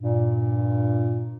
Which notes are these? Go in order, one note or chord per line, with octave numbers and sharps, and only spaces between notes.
G2 A#2